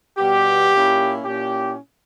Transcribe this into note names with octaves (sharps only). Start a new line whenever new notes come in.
B2 G3 B3 G4
A#2 A#3 C#4 E4
A#2 A#3 C#4 E4 G4